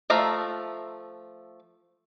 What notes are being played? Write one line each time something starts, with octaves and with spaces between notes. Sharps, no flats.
F3 A3 E5 F5 A#5